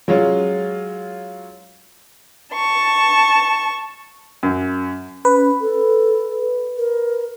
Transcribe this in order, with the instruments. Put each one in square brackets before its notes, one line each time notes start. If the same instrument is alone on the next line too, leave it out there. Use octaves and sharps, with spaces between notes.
[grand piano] F#3 G#3 C#4 F4
[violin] A5 C#6
[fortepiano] F#2
[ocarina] C#4 [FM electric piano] B4
[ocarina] A4
A#4